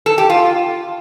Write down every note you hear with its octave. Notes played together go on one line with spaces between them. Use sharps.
A4
G4
F4